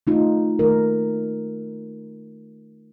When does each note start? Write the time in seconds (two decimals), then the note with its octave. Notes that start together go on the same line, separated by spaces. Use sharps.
0.07 A3 D#4 F4
0.59 D#3 A3 A#4